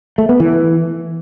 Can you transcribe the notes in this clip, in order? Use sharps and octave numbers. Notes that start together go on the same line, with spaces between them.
A3
B3
E3